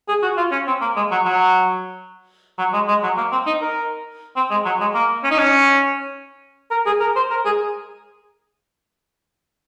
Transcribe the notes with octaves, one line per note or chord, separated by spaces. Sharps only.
G#4
F#4
F4
C#4
C4
A#3
G#3
F#3
F#3
F#3
G#3
G#3
F#3
A#3
C4
D#4
A#4
C4
G#3
F#3
G#3
A#3
C#4
D#4
C#4
A#4
G#4
A#4
C5
A#4
G#4